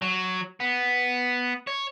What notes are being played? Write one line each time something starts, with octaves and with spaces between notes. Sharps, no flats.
F#3
B3
C#5